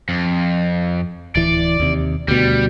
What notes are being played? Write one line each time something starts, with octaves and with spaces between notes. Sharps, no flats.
F2
D1 E3 D5
D#2 C3
D2 B2 G3